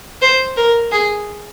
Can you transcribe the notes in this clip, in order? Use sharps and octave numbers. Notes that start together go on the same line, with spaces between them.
C5
A#4
G#4